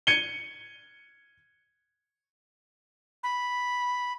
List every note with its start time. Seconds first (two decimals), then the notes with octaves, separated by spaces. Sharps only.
0.07 G#6 C#7 D#7 G7
3.23 B5